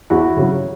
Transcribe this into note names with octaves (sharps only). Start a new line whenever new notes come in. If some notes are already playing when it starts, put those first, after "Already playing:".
E2 E4 F#4
C#3 F#3